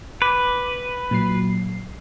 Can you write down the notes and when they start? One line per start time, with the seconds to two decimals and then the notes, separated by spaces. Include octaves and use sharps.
0.22 B4 D6
1.11 A#2 F#3 C7